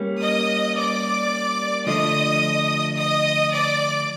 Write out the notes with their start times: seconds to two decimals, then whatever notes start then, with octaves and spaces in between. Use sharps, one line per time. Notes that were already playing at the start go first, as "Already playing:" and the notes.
Already playing: G3 A#3 C#4
0.21 D#5 D#6
0.76 D5 D6
1.87 D3 F3 A3 D#5 D#6
2.97 D#5 D#6
3.52 D5 D6